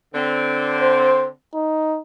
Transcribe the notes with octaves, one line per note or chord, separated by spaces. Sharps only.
D3 C4
C5
D#4